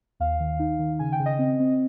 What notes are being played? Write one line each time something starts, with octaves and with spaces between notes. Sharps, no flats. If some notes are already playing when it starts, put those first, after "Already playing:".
D#2 F5
D#3
D#4
D#3
C#3 G#5
G5
C#3
D#5
C4
C4